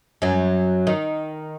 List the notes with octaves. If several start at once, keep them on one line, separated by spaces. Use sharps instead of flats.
F#2 F#3
D#3